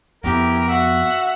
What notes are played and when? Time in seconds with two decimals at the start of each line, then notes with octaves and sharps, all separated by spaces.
0.24 F2 B3 E4 G4 A#4
0.68 F#4 E5 F#5